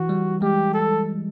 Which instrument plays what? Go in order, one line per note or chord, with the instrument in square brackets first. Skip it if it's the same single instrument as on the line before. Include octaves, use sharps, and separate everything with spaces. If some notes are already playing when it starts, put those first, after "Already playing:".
Already playing: [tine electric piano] E3 [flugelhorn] F#4
[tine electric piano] G3
[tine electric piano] G#3 [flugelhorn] G4
[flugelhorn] A4